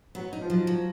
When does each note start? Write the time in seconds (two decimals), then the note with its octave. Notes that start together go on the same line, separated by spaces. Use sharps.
0.15 F#3 B3
0.33 D#4
0.41 F3
0.50 F#3
0.67 F#3